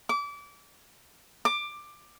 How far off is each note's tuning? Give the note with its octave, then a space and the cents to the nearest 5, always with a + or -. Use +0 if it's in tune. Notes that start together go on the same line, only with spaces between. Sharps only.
D6 -30
D6 +15